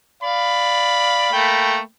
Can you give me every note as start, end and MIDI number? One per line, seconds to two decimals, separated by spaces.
0.23 1.31 74
0.23 1.31 77
0.23 1.83 83
1.33 1.79 57
1.33 1.79 58
1.33 1.79 79